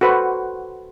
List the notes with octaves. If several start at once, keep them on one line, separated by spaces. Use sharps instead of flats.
F#4 A4 B4 C5 F#5